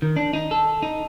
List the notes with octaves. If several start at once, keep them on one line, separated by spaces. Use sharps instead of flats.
D#3
D4
D#4
A4
D#4